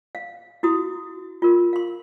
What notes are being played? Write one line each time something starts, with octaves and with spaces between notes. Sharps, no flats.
F5
E4 F#4 D#6
F4 A#4
F5 C6